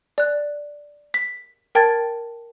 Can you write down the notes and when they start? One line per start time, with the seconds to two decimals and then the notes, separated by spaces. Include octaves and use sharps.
0.18 D5 F#6
1.14 B6
1.75 A#4 G5 A5 G#6 A6